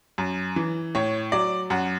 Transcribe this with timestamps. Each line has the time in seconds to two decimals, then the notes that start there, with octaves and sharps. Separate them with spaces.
0.18 F#2
0.56 E3
0.95 A2 C#5
1.32 F#3 D5
1.70 F#2 F#5